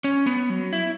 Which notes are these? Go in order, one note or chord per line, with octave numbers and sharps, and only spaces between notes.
C#4
B3
F#3
E4